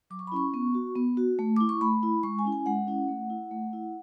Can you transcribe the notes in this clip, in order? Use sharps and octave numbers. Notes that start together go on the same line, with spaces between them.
F#3 D6
C#6
B5
C#4 E4 C#6
B3
F#4
B3
F#4
A3
E4 D6
C#6
A3 B5
E4
G#3 C#6
G#5
C#4 E4
G#5
G#3 F#5
C#4 E4
A3
E4
A3
E4